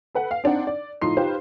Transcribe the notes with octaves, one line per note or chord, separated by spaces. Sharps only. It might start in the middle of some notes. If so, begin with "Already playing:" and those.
A4 B4 F#5
F5
C4 D4 D#4 F#5
D5
A2 F3 D#4 C6 C7
D#4 F4 G4 B4 C5